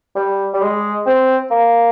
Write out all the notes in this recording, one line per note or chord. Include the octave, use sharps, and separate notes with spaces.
G3
G3
G#3
C4
A#3